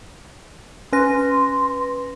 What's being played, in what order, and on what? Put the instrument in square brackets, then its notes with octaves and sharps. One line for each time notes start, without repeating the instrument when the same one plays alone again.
[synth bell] C#4 B4 A#6 [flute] C6